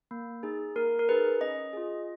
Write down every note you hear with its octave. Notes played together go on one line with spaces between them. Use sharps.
A#3
D#4 G#4
A#3 A#4
A#4
D#4 G#4 B4
C#4 D#5
F4 G#4